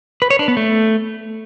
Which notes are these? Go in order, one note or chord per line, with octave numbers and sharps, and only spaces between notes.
B4
C#5
D4
B3
A3